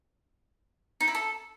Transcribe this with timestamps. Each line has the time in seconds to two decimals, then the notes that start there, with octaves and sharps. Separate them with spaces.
1.00 D#4
1.08 E4
1.15 A4